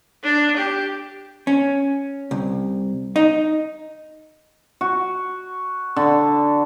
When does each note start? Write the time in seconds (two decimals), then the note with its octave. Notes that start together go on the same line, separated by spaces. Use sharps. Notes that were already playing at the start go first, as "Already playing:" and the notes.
0.24 D4
0.57 G4
1.47 C#4
2.31 C2
3.16 D#4
4.81 F#4
5.96 D3